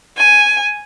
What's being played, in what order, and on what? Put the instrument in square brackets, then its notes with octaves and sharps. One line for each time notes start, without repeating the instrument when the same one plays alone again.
[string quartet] G#5